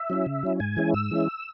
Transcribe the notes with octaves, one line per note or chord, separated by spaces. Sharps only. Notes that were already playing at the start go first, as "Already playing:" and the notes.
Already playing: E5
F#3 C#4 E4
C#3
F#3 C#4 E4
G#2 G#5
E3 G#3 C#4 E4
G#2 E6
E3 G#3 C#4 E4